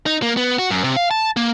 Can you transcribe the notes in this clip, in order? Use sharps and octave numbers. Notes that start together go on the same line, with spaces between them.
D#4
A#3
B3
F#4
F#2
C3
F5
A5
A#3